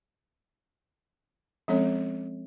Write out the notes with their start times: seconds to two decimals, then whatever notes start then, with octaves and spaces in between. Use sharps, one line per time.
1.68 F3 G#3 C4 C#4 A4 C#5